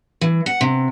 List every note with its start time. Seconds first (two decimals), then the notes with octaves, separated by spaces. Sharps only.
0.21 E3
0.46 F#5
0.61 C3